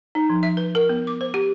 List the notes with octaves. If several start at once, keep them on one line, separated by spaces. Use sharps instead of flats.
D#4
F3
E5
B4
A#4
B3
D6
C5
G4